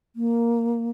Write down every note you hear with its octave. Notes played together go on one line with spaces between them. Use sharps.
A#3